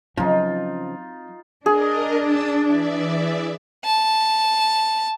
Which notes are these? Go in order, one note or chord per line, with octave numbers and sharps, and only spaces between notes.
C#3 F3 F#3 C4 D#4 F4
D4 G#4 A#4 D#5
A5 D#6 E6
E3 D5 E5
A5